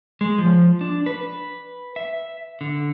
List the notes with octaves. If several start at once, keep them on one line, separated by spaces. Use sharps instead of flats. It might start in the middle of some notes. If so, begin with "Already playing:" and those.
G#3
F3
D4
B4
E5
D3